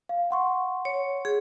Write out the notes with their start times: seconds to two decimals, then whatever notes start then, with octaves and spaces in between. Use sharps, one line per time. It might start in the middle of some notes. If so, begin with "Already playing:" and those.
0.09 F5
0.31 F#5 C6 C#6
0.85 C#5
1.25 G#4